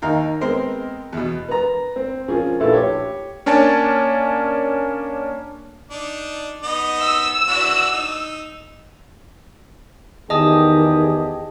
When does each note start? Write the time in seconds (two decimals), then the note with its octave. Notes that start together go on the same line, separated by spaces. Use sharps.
0.02 D#2 D#4 A#4 F5 A#5
0.41 G#3 B3 C4 A#4 C5
1.13 E2 B2
1.49 B4 A#5
1.96 C4
2.28 F3 C#4 F4 G#4 A#4
2.60 A#1 A3 E4 A4 B4 A5
2.72 G4 C#5
3.46 A#3 C#4 D4 G#5 A5
5.91 D4 D#4
6.63 B3 D#4 D#5
7.00 E6
7.47 E3 D4 F#4
7.92 D#4
10.30 E2 D#3 G4 G#4 D#5 A5 D#6